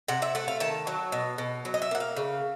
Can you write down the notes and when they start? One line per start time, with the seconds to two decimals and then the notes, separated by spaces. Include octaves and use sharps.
0.08 C3 F#5
0.22 E5
0.35 A3 F#5
0.48 F5
0.60 D#3 A5
0.87 F#3
1.12 B2
1.38 B2
1.65 F#3
1.74 D#5
1.82 E5
1.91 A#3 F#5
2.00 F5
2.17 C#3